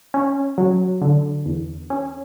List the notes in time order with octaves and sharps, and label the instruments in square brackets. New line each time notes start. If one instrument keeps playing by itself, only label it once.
[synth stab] C#4
F#3
D3
E2
C#4